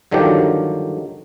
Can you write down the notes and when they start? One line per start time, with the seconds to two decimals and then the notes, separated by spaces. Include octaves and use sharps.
0.11 G2 D3 D#3 F3 F#3 G4